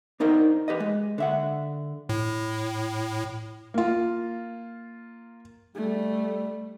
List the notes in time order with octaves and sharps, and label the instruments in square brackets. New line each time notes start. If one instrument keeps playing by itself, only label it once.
[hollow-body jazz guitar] D4 D#4 A#4 C5
G4 B4 D#5
G#3
D3 E5 F#5
[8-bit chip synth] A2
[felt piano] A#3 F4
[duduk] G3 [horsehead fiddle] A3